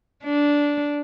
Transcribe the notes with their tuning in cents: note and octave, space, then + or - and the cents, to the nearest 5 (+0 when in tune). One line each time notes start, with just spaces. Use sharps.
D4 -10